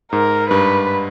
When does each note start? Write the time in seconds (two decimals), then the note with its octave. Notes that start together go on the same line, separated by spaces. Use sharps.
0.12 G#2 A#4
0.50 G2 B4